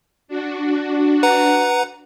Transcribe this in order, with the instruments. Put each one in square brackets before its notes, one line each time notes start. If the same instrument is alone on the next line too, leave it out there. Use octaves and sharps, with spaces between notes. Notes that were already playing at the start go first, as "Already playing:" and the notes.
[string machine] D4 F#4
[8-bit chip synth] B4 F#5 A#5